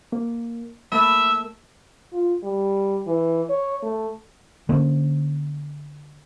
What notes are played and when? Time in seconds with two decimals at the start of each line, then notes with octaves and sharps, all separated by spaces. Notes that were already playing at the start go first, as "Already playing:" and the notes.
0.12 A#3
0.92 A3 A#3 A#4 E5 B5
2.13 F4
2.44 G3
3.07 E3
3.50 C#5
3.83 A3
4.69 D3 A#3 C#4